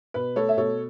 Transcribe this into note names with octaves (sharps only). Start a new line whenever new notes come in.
B2 B4
A3 A4 C#5
E5
B2 A4 C#5